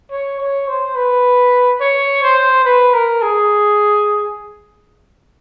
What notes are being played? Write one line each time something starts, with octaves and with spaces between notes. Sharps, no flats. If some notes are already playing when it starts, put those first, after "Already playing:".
C#5
C#5
C5
B4
C#5
C5
B4
A#4
G#4